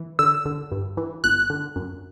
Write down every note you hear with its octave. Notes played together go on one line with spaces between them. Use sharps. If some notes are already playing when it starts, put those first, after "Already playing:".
Already playing: E3
D3 E6
D3
G2
E3
G1 F#6
D3
F#2